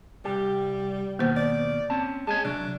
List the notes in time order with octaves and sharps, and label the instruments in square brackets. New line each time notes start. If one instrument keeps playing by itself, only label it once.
[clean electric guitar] C2 G4 [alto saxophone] G3
[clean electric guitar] D#2 B2 D#3 [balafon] A#3 C5
[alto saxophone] D5
[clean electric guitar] C4 C#4 A5
[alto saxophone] G#3 [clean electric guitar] C#5 G#5 A5
[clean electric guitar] C3 F#3 [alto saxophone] D4